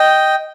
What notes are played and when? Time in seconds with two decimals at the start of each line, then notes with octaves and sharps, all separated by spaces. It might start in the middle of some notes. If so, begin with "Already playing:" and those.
Already playing: D#5 G5